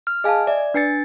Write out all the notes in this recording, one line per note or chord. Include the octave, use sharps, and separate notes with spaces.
F6
G#4 D#5 F5 G#5 A5
D5 E5
D4 B4 G#5 A6 C7 C#7